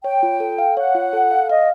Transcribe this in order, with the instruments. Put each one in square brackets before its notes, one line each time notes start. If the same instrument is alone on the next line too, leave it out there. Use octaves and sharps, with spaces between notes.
[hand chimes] C#5 [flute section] G5
[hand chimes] F4
A4
F5
[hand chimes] C#5 [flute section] F#5
[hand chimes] F4
A4
F5
[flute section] D#5 [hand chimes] F5